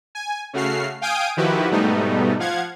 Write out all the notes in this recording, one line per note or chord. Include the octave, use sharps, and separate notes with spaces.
G#5
C#3 A3 F#4 F6 C7
F5 G5 G#5 D#6 G6 D7
D#3 F3 E4 F#4 G4 B4
G#2 B2 G3 A3 B3 D#4
F3 F5 F#5 G#6